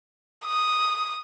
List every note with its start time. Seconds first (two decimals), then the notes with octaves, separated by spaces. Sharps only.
0.46 D#6